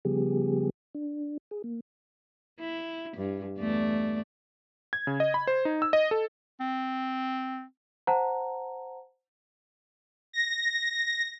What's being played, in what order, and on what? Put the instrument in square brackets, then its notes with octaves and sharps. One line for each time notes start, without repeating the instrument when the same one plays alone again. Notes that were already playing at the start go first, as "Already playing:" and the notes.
[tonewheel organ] C#3 F3 G3 B3 G4 G#4
D4
G#4
A#3
[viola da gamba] E4
G2
E2 A3 D5
[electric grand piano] G#6
C#3
D#5
B5
C5
D#4
E6
D#5
A4
[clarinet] C4
[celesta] C5 F#5 A5 A#5
[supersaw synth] A#6